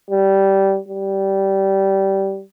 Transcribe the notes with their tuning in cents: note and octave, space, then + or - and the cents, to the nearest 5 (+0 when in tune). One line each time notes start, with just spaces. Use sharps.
G3 -15
G3 -15